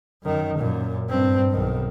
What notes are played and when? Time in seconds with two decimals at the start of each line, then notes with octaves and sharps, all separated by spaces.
0.23 F#2 D#3
0.58 F#2 A#2
1.09 G2 C4
1.51 B1 D#3